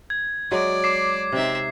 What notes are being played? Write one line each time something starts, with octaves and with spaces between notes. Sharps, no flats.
G#6
F#3 G#3 D5
D6 C7
C3 C4 D#4 E5